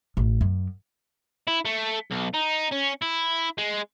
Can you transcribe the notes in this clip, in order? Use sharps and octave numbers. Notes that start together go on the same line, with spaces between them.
A1
F#2
E4
A3
B1
D#4
C#4
E4
G#3